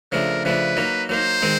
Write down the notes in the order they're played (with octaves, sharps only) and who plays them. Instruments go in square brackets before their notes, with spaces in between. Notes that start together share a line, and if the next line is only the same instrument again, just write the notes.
[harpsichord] C#3 F3 A3 D4 [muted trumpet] A#4
[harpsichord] C#3 F3 A3 D4 [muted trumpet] B4
[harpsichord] F#3 A#3 D#4
[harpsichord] F#3 A#3 D#4 [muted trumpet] C5
[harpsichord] D#3 G#3 C4